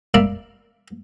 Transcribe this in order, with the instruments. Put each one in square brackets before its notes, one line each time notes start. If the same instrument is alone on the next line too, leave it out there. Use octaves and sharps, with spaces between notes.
[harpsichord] A#4 D5 E5 F5 A#5 B5